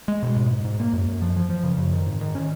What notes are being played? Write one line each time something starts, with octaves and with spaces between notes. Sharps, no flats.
G#3
B2
G#2
G#2
G#2
A#3
F#2
F#2
F3
F3
F3
C#3
F#2
D#3
G#2
D#3
C#4